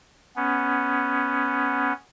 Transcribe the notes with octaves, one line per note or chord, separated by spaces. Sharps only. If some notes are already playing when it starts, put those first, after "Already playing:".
B3 C#4